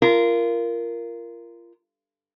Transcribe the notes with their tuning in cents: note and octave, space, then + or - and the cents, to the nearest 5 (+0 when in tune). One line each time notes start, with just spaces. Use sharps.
F4 -25 A#4 +0